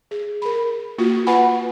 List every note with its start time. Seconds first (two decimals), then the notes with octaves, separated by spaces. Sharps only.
0.11 G#4
0.42 A#4 B5
0.98 A#3 F4 F#4
1.27 F4 B4 F#5 G#5 B5